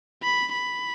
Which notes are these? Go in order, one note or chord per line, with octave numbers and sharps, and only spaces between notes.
B5
B5